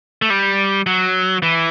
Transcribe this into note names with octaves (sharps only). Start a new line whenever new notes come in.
A3
G3
F#3
E3